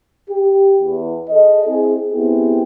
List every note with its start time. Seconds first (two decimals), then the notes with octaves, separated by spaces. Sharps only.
0.30 G4
0.81 E2
1.29 G#4 A4 D#5
1.64 C4 E4 G#4
2.12 B3 C4 E4 G4 G#4